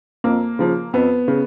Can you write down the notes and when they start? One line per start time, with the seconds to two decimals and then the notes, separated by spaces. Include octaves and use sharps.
0.24 F2 A#3
0.59 C#3 F3
0.93 F2 B3
1.28 C#3